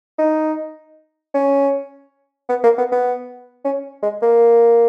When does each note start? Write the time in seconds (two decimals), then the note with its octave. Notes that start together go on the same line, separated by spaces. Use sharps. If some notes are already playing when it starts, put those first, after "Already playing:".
0.18 D#4
1.34 C#4
2.49 B3
2.63 A#3
2.78 B3
2.92 B3
3.64 C#4
4.02 G#3
4.22 A#3